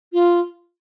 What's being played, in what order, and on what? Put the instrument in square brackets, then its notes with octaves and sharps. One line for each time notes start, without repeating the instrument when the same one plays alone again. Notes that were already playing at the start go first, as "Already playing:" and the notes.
[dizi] F4